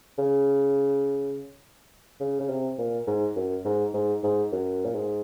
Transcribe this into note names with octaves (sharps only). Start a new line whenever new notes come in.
C#3
C#3
C#3
C3
A#2
G#2
F#2
G#2
G#2
G#2
F#2
A#2
G#2